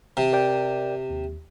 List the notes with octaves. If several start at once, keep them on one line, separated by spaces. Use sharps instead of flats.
C3
A#4 D5 G5
D#2